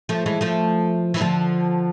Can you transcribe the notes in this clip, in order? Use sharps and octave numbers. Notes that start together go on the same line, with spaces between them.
F3 A3
E3 G#3
F3 A3
E3
D3 F3